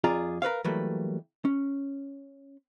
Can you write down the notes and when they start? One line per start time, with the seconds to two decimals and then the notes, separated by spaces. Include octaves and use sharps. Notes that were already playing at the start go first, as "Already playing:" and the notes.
0.04 F2 F4 G#4 D5 A#5
0.42 A#4 B4 C#5 F5
0.64 E3 F#3 G3 A3 A#3 B4
1.45 C#4